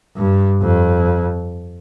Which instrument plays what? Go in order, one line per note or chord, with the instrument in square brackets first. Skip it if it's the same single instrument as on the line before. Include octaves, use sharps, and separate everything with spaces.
[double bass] G2
F2